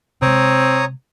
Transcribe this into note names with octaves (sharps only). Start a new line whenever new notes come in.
C3 G#3 C4 C#5 A#5 D#6